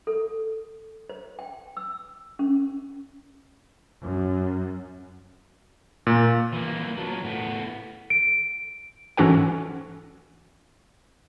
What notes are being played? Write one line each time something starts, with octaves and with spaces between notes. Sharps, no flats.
A4
C5
G5
E6
C#4
F#2
A#2
E3 A#3
F3 F#3
A2 B3
D7
G#2 E3 C#4 F#4 A4 F#5